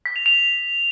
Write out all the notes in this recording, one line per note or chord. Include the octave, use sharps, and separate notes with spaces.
B6
F7
F7